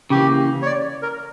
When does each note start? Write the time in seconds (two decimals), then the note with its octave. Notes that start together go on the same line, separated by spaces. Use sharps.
0.10 C#3 E3 A#3 G4
0.62 C#5
0.66 D5
1.03 A#4